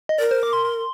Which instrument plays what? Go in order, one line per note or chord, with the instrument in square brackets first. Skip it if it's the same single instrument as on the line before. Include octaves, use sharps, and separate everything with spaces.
[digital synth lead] D#5
[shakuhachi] A#4 [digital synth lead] D5
[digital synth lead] C5
D6
C6
C6